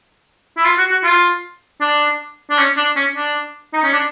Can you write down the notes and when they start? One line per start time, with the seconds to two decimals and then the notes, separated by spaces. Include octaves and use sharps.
0.57 E4
0.65 F4
0.78 F#4
0.91 F#4
1.04 F4
1.81 D4
2.50 D4
2.58 C#4
2.77 D4
2.96 C#4
3.16 D4
3.73 D#4
3.83 C#4
3.93 D4